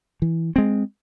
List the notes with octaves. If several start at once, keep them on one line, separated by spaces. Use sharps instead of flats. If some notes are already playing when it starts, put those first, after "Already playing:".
E3
G#3 C4